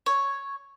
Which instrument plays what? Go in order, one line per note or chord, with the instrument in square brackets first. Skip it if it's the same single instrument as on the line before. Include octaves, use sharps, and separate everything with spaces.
[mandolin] C#5